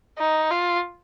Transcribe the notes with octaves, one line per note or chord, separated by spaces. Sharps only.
D#4
F4